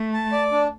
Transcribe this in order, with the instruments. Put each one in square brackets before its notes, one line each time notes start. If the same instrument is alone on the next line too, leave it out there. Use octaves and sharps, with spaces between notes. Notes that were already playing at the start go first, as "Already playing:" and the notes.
Already playing: [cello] A3
[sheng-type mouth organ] A5
D5
D4